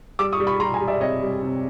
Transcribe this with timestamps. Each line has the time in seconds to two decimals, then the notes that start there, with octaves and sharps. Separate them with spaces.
0.19 G3 D6 E6
0.33 C#6 D#6
0.40 G3
0.47 B5 C#6
0.60 G3 A#5 C6
0.74 G#5 A#5
0.81 G3
0.88 D5 E5
1.01 C3 C#5 D#5
1.22 G3
1.43 C3